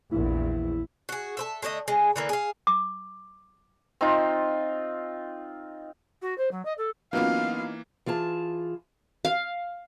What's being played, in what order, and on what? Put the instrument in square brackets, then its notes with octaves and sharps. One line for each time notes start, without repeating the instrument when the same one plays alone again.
[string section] A#1 E2 [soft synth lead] E4
[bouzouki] F#4 G#4
A4 C5 E5
D3 A3 C#5 D#5
C#3 G#3
D3 E3 A#3
G#4 F5
[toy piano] D6
[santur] C4 D#4 F4
[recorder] F#4
C5
F#3
D#5
A4
[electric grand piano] E3 A#3 [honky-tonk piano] F#3 B3 F4 [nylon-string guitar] C#4 D#4 [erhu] F5
[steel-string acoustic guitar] E3 F4 G#4 A5
[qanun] F5